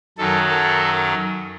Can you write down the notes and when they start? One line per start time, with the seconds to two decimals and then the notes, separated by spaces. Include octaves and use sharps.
0.18 F#2 D#3 F#3 A4
0.48 A4